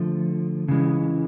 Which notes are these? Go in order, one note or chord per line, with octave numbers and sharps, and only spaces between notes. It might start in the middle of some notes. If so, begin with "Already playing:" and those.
Already playing: D3 F3 A3
C#3 E3 G#3